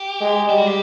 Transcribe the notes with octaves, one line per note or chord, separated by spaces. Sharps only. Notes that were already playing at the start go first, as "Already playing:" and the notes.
Already playing: G4
G#3
G3 G4
F#4
G4